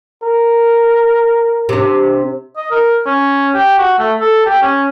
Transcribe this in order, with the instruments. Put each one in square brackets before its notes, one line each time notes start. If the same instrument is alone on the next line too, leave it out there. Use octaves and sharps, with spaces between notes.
[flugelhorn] A#4
[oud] C3 D4
[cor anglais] D#5
A#4
C#4
G4
F#4
A3
A4
G4
C#4